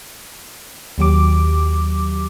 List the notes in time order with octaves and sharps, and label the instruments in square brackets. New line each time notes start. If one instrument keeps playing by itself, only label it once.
[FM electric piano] D#2 F#3 G4 D6